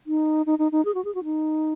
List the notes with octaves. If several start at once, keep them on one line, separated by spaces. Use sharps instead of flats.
D#4
D#4
D#4
D#4
G#4
F#4
G#4
F#4
D#4